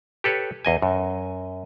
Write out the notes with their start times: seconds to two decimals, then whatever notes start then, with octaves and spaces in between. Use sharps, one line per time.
0.24 G4 A4 B4 C#5
0.65 E2 D#5 G#5
0.82 F#2